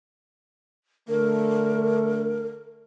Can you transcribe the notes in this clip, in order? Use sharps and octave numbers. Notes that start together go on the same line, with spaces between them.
D3 A3 A#4